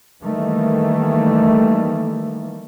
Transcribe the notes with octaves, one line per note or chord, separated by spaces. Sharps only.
D#3 E3 G3 A3 A#3